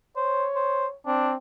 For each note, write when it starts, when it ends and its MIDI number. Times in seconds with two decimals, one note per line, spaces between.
0.16 0.46 72
0.16 0.96 73
0.55 0.87 72
1.07 1.36 60
1.07 1.32 62